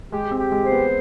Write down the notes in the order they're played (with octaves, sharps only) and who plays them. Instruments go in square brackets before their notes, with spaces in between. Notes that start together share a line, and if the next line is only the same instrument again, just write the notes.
[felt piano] G#3 [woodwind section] G4
[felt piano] C4
[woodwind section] G4
[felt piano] G#3
[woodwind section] C5
[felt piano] B3